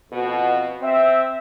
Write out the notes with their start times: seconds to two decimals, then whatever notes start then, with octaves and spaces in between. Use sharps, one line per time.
0.12 F2 B2
0.82 C4 E5